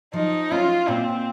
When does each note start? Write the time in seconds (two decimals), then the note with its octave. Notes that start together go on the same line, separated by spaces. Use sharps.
0.13 F3 D#4
0.51 C#4 F4
0.88 A#2 C4